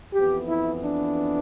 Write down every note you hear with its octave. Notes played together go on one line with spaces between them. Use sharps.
F2 E3 B3 G4
E4
D4